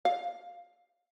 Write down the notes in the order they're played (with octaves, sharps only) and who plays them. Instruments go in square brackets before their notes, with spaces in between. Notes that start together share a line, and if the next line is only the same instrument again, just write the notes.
[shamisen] F5